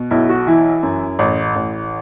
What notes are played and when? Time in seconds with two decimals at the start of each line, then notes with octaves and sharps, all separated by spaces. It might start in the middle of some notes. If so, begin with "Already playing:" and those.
Already playing: B2
0.11 B1 E4
0.29 F#4
0.47 E3 E4
0.83 F#2
1.19 A1
1.56 A1